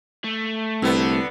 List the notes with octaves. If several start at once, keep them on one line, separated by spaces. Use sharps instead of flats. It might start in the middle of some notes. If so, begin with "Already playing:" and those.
A3
C2 D3 B3